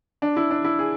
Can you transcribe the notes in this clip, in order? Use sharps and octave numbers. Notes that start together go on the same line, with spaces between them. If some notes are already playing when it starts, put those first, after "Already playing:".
D4
E4
D4
E4
G#4